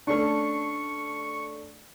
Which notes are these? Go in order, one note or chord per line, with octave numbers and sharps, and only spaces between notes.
A3 C#4 D4 C#6